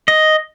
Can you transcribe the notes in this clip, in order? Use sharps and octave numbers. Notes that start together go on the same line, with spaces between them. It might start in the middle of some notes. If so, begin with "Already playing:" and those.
D#5